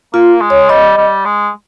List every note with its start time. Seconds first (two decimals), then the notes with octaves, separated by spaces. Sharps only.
0.14 A#3 F4
0.41 G#3
0.50 C#5
0.69 G3 D#5
0.97 G3
1.25 G#3